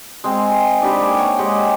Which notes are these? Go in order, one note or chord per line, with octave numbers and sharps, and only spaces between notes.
G#3 C4
C6
D4 D#4 G4 B4
A#3 G#5 D6
C#5 F#5
G#3 G4 D#5 F#5